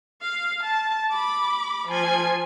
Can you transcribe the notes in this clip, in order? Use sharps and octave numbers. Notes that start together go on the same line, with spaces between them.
F5
A5
B5 D6
F3 G#5